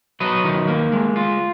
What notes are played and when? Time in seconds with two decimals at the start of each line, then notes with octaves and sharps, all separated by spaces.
0.20 F#3 B4 D#5
0.44 D#3
0.68 A#3
0.92 G#3
1.16 F4